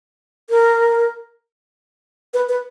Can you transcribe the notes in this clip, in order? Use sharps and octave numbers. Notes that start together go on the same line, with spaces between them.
A#4
B4
B4